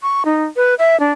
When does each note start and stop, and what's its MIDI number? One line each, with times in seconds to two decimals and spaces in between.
0.02 0.23 85
0.25 0.45 63
0.56 0.74 71
0.79 0.99 76
1.00 1.11 62